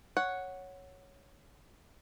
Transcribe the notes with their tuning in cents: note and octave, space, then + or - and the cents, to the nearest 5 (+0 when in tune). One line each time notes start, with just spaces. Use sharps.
C#5 +0 F#5 +0